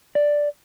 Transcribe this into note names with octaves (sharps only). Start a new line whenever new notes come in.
D5